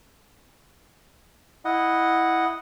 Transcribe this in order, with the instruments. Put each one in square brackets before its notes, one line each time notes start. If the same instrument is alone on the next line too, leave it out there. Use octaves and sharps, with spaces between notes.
[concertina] E4 D#5 F#5